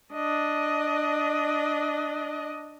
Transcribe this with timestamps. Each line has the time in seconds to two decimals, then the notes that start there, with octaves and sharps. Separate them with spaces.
0.14 D4 D#5